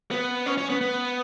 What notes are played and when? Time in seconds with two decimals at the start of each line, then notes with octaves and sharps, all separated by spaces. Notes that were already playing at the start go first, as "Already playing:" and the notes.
0.11 B3
0.46 C#4
0.58 C#4
0.69 B3
0.81 B3